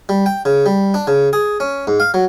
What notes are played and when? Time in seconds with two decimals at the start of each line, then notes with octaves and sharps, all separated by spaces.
0.09 G3
0.26 G5
0.45 C#3
0.66 G3
0.94 D4
1.07 C#3
1.33 G#4
1.60 C#4
1.87 G#2
2.00 F5
2.14 F#3